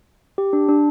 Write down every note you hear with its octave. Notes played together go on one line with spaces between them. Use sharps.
G4
D4
D4